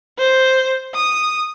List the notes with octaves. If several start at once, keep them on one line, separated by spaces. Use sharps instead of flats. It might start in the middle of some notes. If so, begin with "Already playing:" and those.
C5
D#6